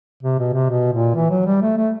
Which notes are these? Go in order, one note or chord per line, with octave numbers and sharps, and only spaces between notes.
C3
B2
C3
B2
A#2
E3
F#3
G3
A3
A3